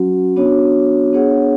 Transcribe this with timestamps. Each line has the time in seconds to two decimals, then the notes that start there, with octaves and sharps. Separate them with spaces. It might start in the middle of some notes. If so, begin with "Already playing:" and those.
Already playing: F#3 C#4 F#4
0.37 B3 D4 F#4 C#5
1.13 B3 D4 G#4 C#5 F#5